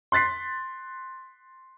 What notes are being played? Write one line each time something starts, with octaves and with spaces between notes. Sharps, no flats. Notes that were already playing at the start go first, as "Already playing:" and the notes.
C6 F#6 A6 B6 C7